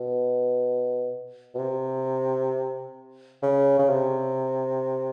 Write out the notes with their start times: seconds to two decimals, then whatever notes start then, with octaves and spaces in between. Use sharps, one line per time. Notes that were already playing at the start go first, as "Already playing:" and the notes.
Already playing: B2
1.55 B2
1.59 C3
3.43 C#3
3.79 C#3
3.89 C3